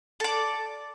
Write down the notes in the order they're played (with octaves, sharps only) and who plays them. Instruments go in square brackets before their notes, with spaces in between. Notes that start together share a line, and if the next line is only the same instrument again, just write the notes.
[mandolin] A4 D5